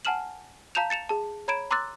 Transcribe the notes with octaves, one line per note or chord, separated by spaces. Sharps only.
F#5 G#5 A5 F6 E7 F#7
F5 A5 A#5 G6 E7 F7
A6 C#7 E7 F7
G#4 A5
C#5 A#5 B5 G#6 D7 E7
A#5 C6 D6 E6 F#6 A6